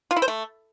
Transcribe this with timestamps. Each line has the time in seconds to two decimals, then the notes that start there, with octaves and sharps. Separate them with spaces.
0.11 F4
0.16 E4
0.22 C5
0.28 A3